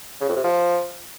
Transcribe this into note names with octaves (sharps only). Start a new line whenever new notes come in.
C#3
F2
C3
F3